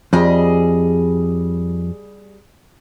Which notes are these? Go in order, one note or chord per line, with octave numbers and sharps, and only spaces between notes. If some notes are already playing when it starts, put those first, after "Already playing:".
F2 G3 G#4 D#5